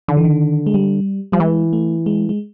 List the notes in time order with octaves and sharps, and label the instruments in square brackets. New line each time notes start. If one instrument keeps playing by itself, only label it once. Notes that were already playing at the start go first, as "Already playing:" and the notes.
[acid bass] D3 [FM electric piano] D#3
[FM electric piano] E3
D#3
G#3
G3
[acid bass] F3 [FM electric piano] G3
[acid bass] E3 [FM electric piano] G#3
[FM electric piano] A3
G#3
G#3